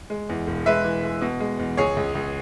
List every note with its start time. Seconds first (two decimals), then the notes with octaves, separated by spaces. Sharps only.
0.10 G#3
0.29 E2
0.47 E1
0.66 G#3 B4 E5
0.84 E3
1.03 G#3
1.21 B2
1.40 G#3
1.59 E2
1.77 C#2 G#4 C#5
1.97 C#2
2.15 C#2